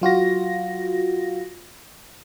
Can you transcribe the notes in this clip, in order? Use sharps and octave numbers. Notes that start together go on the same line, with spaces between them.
F#3 F4 F#4 A#6